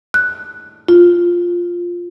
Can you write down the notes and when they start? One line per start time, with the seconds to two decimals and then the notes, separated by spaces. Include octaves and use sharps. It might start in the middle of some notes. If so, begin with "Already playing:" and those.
0.14 F#6
0.88 F4